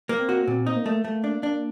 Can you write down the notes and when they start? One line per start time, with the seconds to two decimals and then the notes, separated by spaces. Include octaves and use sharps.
0.09 A#3
0.18 C4
0.29 F#4
0.47 A#2 C4
0.66 D#4
0.76 A#3
0.86 A3
1.05 A3
1.24 D4
1.43 D4